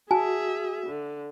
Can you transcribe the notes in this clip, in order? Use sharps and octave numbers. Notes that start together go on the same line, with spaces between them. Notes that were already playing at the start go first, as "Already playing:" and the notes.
F#4 G#4 E5 G#5 A5
D3